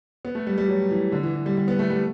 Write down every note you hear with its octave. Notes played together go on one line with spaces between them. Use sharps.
B3
A3
G3
G3
F#3
E3
D3
E3
E3
G3
G3
B3
A3
G3